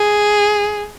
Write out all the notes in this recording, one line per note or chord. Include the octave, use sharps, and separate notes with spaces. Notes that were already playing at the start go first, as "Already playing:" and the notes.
Already playing: G#4